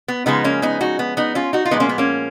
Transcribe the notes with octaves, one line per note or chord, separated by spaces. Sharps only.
B3
C#3 F3 G#3 B3 D#4
A#3 C#4
B3 D#4
D#4 F#4
B3
B3 D#4
C#4 F4
D#4 F#4
F4
A#2 F3 G#3 B3 D#4
A#3 C#4
B3
A#3 C#4